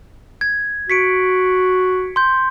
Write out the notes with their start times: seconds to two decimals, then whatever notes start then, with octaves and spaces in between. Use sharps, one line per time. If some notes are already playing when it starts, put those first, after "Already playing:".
0.41 G#6
0.90 F#4 B6 C#7 D7
2.16 C6 G6